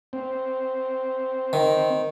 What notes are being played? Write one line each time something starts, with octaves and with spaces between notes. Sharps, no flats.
C4
D#3